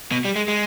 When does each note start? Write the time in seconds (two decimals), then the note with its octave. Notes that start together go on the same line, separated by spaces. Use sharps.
0.12 B2
0.25 G3
0.36 G#3
0.48 G#3